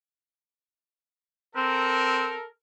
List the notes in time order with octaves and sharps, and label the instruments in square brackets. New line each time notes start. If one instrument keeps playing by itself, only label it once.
[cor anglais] C4 [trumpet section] A4 A#4